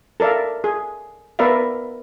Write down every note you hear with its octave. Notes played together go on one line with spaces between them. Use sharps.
A4 A#4 D5 E5 F5
G#4
B3 A#4 B4 D5 E5 F5